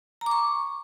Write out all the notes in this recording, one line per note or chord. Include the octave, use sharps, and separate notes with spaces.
A#5
D6
C#6